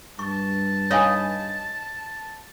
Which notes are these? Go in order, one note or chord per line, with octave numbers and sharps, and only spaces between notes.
G2 A5 C#6
D#4 B4 C#5 D#5 F5 G#5